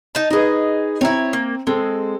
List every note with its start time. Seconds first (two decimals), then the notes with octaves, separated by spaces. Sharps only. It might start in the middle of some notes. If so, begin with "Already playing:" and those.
0.15 D#4 A5
0.31 D#4 G#4 B4 D#5
1.01 C4 E4 C#5 A#5
1.33 A#3
1.67 G#3 C4 A4